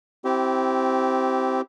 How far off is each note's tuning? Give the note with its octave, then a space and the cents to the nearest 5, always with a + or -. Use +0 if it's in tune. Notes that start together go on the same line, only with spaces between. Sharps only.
C4 +0 E4 +0 G4 -20